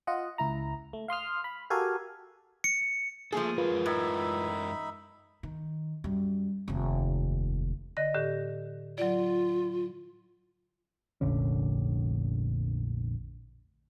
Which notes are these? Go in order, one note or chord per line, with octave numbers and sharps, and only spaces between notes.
F4 D#5 F#5
C#2 E4 A#5
A3
F5 C6 D#6 F6
B5
F#4 G4 A4 A#4 F5 G#5
C#7
F3 A3 A#3 G#4 A4
F#2 G#3 F4 A#4 B4
A2 D#4 E5 B5
D#3
F#2 G3
F1 D#2
D3 D#5 A#6
A2 D3 G4
F#3 F4 D5
F1 A#1 D3 C#4